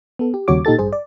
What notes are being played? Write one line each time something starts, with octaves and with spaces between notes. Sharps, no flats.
B3 A4
G4
D#2 C#3 G3 F#4 C#5 D6
A#2 D#4 G4 A4 A6
A1 G2 G#4 C5
D5